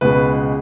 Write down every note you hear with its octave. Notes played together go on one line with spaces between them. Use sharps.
C#2 B2 G#3 B4